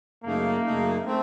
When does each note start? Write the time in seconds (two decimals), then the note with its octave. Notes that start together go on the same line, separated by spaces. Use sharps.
0.23 F#2 C#3 A3 A#3 D#4
0.65 F#2 C#3 A3 D#4
1.06 A3 C4